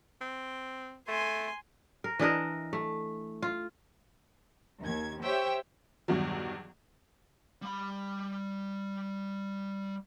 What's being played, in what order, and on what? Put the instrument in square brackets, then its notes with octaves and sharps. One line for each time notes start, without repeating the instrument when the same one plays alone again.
[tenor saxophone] C4
[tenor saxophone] A3 [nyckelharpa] G#5 C6
[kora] A#4
E3 D4 A#4 D#5
A3
F4
[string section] D#2 G#6
G4 C5 C#5 E5 G5
[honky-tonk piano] E2 G2 B2 D#3 F#3
[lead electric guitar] G3 B5